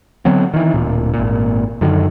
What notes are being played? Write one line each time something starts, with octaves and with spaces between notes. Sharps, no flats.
D3 F#3 B3 C4
D#3 E3
D1 A#2
G#1 A#2
F#2 D3 D#3